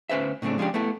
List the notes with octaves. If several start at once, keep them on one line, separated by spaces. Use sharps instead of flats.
D2 C#4 B4 C5 E5
A2 C#3 A3 C4 D4
F3 G#3 C#4 D4 G4
A3 B3 E4 A4